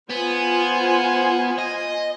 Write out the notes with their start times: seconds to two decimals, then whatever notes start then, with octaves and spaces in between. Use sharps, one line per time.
0.10 B3 F4 C5 G#5
1.58 D#5